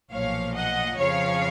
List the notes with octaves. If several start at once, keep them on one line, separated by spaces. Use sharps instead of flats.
B1 A#2 F3 C#5 F5
D#5 F#5
F2 C#3 F3 C#5 F5